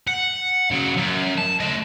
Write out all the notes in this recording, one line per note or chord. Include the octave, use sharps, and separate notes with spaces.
F#5
C#3 F#3
F#2
A5
A3 D#5